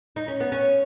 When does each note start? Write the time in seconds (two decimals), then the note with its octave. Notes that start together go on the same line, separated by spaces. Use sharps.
0.16 D#4
0.28 C#4
0.40 B3
0.52 C#4